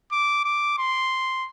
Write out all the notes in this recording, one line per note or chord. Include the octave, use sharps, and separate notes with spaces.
D6
D6
C6